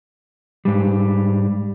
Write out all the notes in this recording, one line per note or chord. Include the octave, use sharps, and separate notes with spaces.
G#2 G3